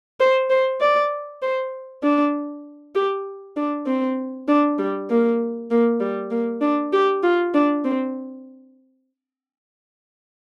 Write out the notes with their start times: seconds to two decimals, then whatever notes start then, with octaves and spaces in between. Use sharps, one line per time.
0.20 C5
0.50 C5
0.81 D5
1.42 C5
2.03 D4
2.95 G4
3.56 D4
3.86 C4
4.48 D4
4.78 G3
5.10 A#3
5.70 A#3
6.01 G3
6.31 A#3
6.61 D4
6.93 G4
7.23 F4
7.54 D4
7.84 C4